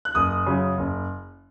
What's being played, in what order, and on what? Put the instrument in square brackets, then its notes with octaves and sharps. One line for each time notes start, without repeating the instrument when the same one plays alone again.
[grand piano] F#6
F#1 D#6
F#2 C#3
F#1